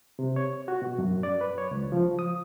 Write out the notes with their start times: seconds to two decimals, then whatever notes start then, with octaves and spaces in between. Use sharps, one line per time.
0.19 C3
0.36 C#5
0.68 F#4
0.82 B2
0.98 F#2
1.23 D5
1.41 B4
1.58 C#5
1.71 C#2
1.92 F3
2.19 D#6